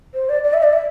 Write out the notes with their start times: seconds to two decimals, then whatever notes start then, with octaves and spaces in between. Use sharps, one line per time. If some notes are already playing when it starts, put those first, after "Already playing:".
0.14 C5
0.29 D5
0.44 D5
0.54 E5
0.63 D5
0.73 E5